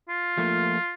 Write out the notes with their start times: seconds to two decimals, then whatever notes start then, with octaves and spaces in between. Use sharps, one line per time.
0.09 F4
0.38 F3 A3 A#3